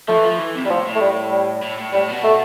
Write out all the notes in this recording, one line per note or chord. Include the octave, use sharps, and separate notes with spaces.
F3 A3
E3
F3
E3
C3
B2 G3
A2 F3
A2
A3
G3
G3
A2
A2
A2 G3
B2
A3